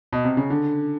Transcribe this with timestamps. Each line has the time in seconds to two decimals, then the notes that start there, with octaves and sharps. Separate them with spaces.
0.13 B2
0.25 C3
0.37 C#3
0.50 D3